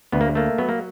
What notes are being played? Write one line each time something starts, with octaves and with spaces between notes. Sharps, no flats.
D2 B3
A#3
A3 A#3
F#3 B3
A#3